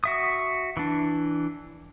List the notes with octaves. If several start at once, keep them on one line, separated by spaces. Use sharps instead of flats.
F#4 E5 D#6
E3 D4